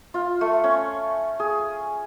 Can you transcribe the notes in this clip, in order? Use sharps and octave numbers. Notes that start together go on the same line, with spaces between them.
F4
A3
C#4
G#4